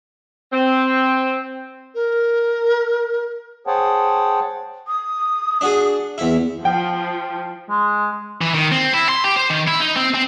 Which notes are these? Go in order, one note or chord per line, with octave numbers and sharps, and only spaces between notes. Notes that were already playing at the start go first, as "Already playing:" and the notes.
C4
A#4
G#4 C5 C#5 F#5 G5 A5
D#6
D4 F#4 G#4
E2 E4
F3 G5
G#3
E3
D#3
C4
E4
C6
G4
C5
D#3
E4
D#4
C4
C4